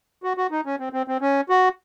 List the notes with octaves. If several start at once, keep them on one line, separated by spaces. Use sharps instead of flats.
F#4
F#4
D#4
C#4
C4
C4
C4
C#4
F#4